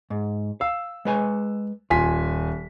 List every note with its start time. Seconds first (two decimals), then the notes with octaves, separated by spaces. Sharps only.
0.10 G#2
0.61 F5 E6
1.05 G#3 B4 G#5
1.90 D#1 F4 G#5 B6